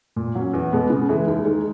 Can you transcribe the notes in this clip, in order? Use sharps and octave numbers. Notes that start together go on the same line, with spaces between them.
A#2
F#3 C#4
E2
B2 G#3 B3
C#3
E3 G#3
D#2
D#3 G#3